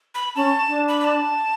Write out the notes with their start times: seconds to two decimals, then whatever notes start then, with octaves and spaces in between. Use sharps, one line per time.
0.15 B5
0.35 C#4 A5
0.68 D4
0.88 B5
1.00 B5
1.04 A5